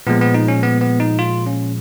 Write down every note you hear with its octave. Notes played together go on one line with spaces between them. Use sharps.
A#2 F3 G#3 B3
B3
D#4
C#4
B3
B3
D#4
F4
C#4